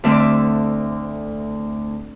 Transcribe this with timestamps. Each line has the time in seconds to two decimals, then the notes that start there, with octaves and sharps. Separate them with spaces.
0.04 D2 D3 A3 C4 E5
0.11 D5
0.19 E5